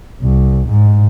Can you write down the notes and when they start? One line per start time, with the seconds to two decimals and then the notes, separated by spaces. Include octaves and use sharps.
0.22 C2
0.68 G#2